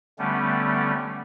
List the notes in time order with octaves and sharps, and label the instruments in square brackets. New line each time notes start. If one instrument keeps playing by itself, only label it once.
[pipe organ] D3 G3 A3 B3 C#4